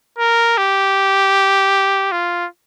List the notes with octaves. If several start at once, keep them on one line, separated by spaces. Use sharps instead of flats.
A#4
G4
F4